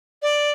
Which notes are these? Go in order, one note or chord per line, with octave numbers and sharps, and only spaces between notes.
D5